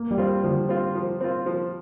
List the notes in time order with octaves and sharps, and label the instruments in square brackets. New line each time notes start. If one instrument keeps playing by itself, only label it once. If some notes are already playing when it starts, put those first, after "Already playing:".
Already playing: [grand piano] A#3
G3
[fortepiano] C4 F4
[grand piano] D3 [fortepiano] F3
[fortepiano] C4 F4
F3
C4 F4
F3